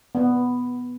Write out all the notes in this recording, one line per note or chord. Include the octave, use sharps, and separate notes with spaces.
B3